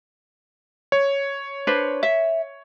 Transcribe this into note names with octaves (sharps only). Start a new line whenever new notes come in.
C#5
D4 B4 C5
E5